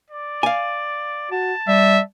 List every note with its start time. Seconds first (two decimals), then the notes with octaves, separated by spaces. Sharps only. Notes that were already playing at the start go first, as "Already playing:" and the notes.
0.11 D5
0.43 F5 G#5
1.31 F#4 A5
1.68 G3 E5